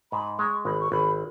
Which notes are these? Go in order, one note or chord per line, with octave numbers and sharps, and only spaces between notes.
G#2 B5
G#3 C#6
G#1 B5
C#6
G#1 B5